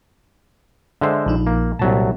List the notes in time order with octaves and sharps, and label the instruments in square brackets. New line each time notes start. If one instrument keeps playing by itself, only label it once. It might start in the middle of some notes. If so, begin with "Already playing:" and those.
[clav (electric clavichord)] D3 G#3 C5 [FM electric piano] E5
[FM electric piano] A#1 F3 D#4
[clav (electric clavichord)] A#3
[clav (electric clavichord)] C2 F#3 A5 [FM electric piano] A#2